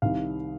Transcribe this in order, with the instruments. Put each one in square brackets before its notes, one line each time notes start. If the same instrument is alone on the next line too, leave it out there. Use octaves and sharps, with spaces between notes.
[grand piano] C2 C3 D#3 F5